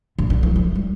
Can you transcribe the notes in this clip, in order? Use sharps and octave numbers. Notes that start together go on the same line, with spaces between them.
D3
D3
E3
F3
G3